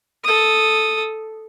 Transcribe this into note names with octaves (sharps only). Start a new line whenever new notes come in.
A4 D#6